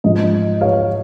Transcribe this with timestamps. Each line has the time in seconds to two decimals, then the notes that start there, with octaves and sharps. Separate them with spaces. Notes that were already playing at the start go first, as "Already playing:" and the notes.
0.04 G#2 F3 G#3 D#5
0.61 C#5 F5